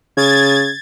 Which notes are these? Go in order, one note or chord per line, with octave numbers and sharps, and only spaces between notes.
C#3 G#6 A6